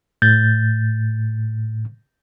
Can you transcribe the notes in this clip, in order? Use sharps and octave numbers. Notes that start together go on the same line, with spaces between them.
A2 G6 A6